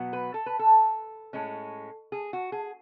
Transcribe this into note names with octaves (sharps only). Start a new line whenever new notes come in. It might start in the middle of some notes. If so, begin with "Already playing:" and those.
Already playing: B2 F#3 B3
B4
A4
B4
A4
A2 G#3 C#4
G#4
F#4
G#4